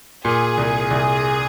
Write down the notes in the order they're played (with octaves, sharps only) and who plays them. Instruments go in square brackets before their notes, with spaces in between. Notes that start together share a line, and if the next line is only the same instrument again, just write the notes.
[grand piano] A#2 [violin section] G#4
[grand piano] C2
C2